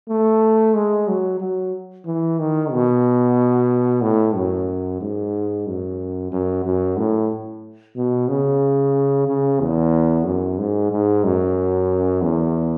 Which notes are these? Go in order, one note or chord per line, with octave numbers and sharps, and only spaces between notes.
A3
G#3
F#3
F#3
E3
D#3
B2
A2
F#2
G#2
F#2
F#2
F#2
A2
B2
C#3
C#3
E2
F#2
G#2
G#2
F#2
E2